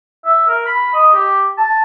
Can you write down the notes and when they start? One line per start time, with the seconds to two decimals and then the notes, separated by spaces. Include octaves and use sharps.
0.25 E5
0.48 A#4
0.66 B5
0.94 D#5
1.14 G4
1.58 A5